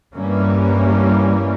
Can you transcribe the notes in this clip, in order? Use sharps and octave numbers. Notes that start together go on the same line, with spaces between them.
G2 E3 G3 A#3 C#4